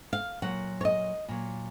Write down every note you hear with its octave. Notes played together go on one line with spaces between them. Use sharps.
F5
A#2 F#3 F#5
C#5
D#5
A#2 F#3